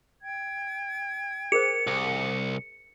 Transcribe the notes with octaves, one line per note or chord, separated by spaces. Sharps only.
G5 G#6
G#4 A#4 C5 C#7
C2